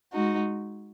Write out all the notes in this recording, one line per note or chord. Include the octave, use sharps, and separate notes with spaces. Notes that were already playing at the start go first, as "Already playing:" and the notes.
G#3 D#4 F#4